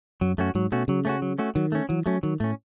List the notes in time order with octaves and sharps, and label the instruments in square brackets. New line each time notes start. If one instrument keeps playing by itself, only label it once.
[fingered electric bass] F#2 [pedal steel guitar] F#3
[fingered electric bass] F#2 [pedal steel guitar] A3 C#4 F#4
[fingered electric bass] G#2 [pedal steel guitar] F#3
[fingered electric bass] B2 [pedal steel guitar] A3 C#4 F#4
[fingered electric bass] C#3 [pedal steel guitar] F#3
[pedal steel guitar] A3 C#4 F#4
F#3
A3 C#4 F#4
[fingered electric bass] D#3 [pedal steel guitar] F#3
[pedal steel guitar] A3 C#4
[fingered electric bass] E3 [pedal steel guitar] F#3
[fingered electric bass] F#3 [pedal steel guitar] A3 C#4
[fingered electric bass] D#3 [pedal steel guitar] F#3
[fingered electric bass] A2 [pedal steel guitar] A3 C#4